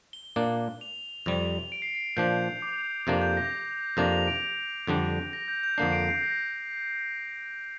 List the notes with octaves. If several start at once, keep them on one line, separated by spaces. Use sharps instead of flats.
G7
A#2 A#3 D4
F7
F2 C3 G3 F7
D7
C7
D7
A#2 F3 D4 G6
D6
F2 C3 A#3 D4 D6
G6
A#6
F2 C3 A#3 D4 F7
F7
D7
F2 D3 G3 D4
A#6
G6
G6
F2 D3 A#3 D4 C7
D7
C7
A#6